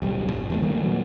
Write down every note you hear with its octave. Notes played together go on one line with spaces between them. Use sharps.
D1 B1 G3
G1
E2 G3 A3
D#3 G3 A3 A#3
A#2 F#3